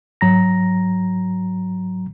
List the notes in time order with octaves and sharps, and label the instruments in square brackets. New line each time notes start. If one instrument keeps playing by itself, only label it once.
[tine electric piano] G#2 F#3 A#5 A#6